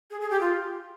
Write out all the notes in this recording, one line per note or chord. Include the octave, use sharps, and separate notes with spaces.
G#4
G#4
G4
F4